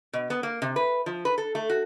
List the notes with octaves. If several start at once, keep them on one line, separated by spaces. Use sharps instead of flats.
B2
B3
A#3
C3
B4
F3
B4
A4
A3
F#4